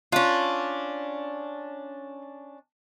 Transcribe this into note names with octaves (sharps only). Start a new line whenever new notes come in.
C#4 D4 F4